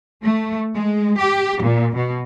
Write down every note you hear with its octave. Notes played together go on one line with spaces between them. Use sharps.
A3
G#3
G4
A#2
B2